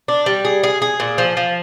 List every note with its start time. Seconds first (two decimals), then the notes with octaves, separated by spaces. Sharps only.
0.08 D4
0.26 G3
0.45 G#4
0.63 G#4
0.82 G#4
1.00 A#2
1.18 F3
1.37 F3